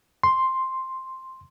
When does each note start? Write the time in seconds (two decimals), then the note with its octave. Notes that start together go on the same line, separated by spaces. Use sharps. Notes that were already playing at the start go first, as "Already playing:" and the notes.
0.23 C6